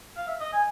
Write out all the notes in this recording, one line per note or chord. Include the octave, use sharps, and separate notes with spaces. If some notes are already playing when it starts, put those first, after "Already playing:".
F5
E5
D#5
G#5